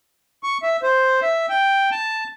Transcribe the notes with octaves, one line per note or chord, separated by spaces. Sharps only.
C#6
E5
C5
E5
G5
A5